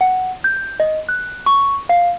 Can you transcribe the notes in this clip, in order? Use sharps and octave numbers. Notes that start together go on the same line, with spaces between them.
F#5
G6
D#5
F#6
C#6
F5